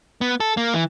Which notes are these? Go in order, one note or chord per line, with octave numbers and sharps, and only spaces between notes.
B3
A4
A#3
E3